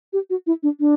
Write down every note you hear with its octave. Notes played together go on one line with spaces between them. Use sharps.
G4
F#4
E4
D4
D4